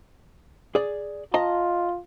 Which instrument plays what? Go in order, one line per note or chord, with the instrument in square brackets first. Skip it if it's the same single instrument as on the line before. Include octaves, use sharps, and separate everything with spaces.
[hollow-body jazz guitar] G#4 D5
[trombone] F4 [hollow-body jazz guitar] D#5 A5 A#5